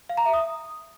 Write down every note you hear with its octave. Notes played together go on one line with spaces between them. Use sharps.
F5
A#5
E5
D#6